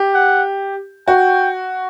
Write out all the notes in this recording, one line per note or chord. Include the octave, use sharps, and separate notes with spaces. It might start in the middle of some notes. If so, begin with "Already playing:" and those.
Already playing: G4
F#5
F#4 G5